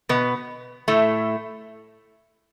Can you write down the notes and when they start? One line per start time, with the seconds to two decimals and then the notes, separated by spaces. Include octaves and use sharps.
0.09 B2 B3
0.88 A2 A3